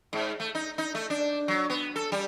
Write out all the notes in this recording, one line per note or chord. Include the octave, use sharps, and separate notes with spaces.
G#2
A3
D#4
D#4
A3
D4
F#3
B3
A4
G3